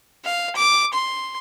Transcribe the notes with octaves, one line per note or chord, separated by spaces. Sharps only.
F5
D6
C6